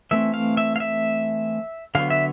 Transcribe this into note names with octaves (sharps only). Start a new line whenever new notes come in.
E3 A3 C4 E5
F5
E5
F5
E5
D3 F#3 B3 F5
E5